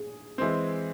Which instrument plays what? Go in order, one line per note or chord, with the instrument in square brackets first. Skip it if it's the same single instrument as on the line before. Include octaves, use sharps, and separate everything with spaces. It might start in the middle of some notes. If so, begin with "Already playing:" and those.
Already playing: [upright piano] G#4
[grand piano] E3 G#3 C4